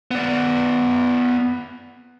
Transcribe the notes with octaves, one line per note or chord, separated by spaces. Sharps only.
B3 D5